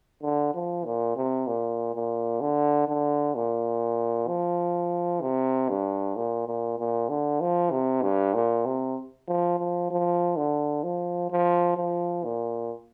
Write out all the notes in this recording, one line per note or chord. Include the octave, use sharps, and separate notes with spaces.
D3
F3
A#2
C3
A#2
A#2
D3
D3
A#2
F3
C3
G2
A#2
A#2
A#2
D3
F3
C3
G2
A#2
C3
F3
F3
F3
D3
F3
F3
F3
A#2